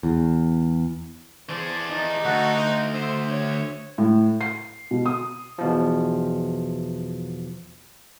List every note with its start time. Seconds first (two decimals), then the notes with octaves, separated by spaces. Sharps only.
0.03 E2
1.49 E3 G#4 C5 D5 A5
1.91 D#4
2.25 D2 F#4 A4 F#5
2.58 C5
2.94 C5 E5 D#6 E6
3.31 C#5
3.98 A2
4.41 C7
4.91 B2
5.06 D#6
5.58 E2 B2 F3